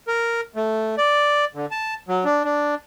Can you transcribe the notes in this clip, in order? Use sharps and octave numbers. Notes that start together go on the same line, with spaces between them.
A#4
A3
D5
D3
A5
F#3
D4
D4